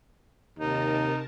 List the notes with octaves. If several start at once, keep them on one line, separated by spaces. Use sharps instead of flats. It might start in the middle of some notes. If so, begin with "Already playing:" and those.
D#2 C3 D#4 A#4 A5